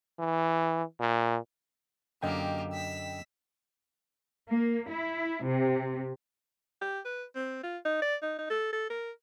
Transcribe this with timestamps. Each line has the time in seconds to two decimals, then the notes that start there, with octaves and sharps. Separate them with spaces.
0.19 E3
1.00 A#2
2.23 F#2 D3 A#3 G4 D#5 G5 G#5
2.73 E6 B6
4.49 A#3
4.90 E4
5.44 C3
6.81 G4
7.05 B4
7.35 C4
7.63 F4
7.85 D#4
8.02 D5
8.22 D#4
8.39 D#4
8.50 A4
8.73 A4
8.90 A#4